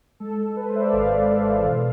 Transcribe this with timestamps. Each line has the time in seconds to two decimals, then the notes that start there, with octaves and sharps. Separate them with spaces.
0.20 G#3 A4
0.38 G#3
0.56 G#3 B4
0.69 C5
0.74 G#3 E5
0.81 D5
0.93 G#1 F5
1.11 G#3
1.29 G#3
1.47 E3
1.65 B2